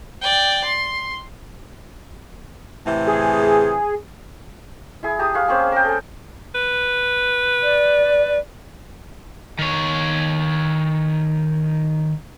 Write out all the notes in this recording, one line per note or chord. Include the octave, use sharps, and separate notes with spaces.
D5 G5
C6
A2 C3 E3
G#4
E4 G#4
G4 A5 A#5 D#6
G#4 B4 F5 C#6
A#3 C4 C#4 G#4
A#4 G5
A4 G#5
B4
D5
D#3 C#5